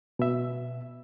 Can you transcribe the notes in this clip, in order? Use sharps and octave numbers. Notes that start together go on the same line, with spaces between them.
B2 E5